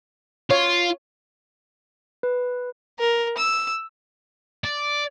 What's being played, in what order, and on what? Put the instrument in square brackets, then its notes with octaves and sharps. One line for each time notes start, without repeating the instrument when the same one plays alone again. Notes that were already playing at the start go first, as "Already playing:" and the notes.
[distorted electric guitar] F4 [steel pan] C#5
[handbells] B4
[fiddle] A#4
E6
[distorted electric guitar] D5